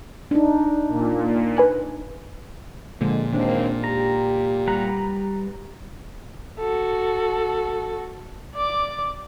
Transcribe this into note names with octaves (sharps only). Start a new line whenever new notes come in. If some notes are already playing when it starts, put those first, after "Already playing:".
D4 D#4
A#2
B4 G#5 F#6
A#2 D3 F3 G#3
D#2 D#3 G#3 A#3 C4 D4
G4 A#5
G3 B4 F#5 A#5
F#4 A4
D5 D6